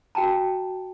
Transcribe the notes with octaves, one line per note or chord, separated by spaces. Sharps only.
F#4 G5 A5 A#5